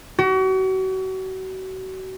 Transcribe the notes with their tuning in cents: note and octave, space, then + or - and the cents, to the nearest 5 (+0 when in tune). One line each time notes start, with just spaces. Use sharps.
F#4 +35